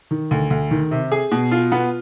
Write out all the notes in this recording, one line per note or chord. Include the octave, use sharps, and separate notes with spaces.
D#3
D2
D2
D#3
C3
G#4
B2
F4
B3